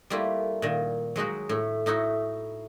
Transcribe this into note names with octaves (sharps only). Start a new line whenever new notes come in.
G3 A3 A#3 E4 F4
A#2 D#3
F#3 G#3 D#4 F#4
A2 E4
A2 D#4 E4 F#4